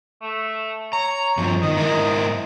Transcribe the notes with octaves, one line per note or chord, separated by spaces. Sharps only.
A3
C#5 A#5
G2 F3
D#3 D#5
G#2 E4 A#4